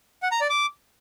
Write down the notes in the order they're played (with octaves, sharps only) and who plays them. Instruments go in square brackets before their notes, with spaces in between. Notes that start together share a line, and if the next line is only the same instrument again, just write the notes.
[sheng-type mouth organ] F#5
A#5
D5
D6